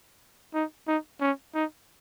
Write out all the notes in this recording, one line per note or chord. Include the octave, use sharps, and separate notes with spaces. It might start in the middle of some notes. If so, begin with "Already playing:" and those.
D#4
D#4
C#4
D#4